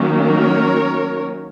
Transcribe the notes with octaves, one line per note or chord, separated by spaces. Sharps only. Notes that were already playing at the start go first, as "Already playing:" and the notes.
Already playing: D#3 F#3 A#3 C#4
A#4 C#5